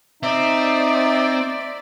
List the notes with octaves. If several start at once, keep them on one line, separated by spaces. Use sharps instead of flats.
C4 D#4 D5 E5